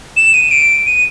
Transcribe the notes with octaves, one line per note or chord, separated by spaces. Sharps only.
E7
D#7
D7
D#7